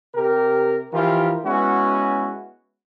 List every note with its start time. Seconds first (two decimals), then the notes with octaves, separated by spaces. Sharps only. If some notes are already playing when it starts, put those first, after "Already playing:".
0.14 C3 G4 A#4
0.92 E3 F3 F4 G4 A#4
1.44 G#3 B3 C#4 E4 F#4